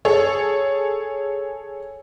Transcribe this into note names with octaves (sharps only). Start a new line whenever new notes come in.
G#4 A4 C#5